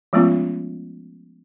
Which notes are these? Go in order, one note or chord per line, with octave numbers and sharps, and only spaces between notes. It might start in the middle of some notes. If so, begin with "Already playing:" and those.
F3 G#3 A3 B3 C#4 F4